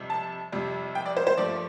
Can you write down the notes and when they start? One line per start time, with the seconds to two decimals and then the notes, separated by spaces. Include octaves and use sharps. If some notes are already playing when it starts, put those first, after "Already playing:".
Already playing: F2 C3 G3
0.10 A5
0.52 F2 C3 G3
0.95 G5
1.06 D5
1.17 C5
1.27 C5
1.37 G2 F3 A3 D5